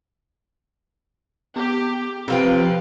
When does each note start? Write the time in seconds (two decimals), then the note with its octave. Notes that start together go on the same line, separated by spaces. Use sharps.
1.56 B3 G4
2.28 C3 F3 C4 F4 B4 G5